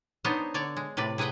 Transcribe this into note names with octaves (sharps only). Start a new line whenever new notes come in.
B3 D4 D#4 C5 C#5
D3 C#5 D5
G#3
A2 C3 B4 D5
C3 G#4 B4 F#5 G5